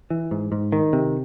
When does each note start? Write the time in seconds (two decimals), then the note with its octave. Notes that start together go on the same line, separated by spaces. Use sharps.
0.10 E3
0.31 G#2
0.52 G#2
0.72 D#3
0.93 C3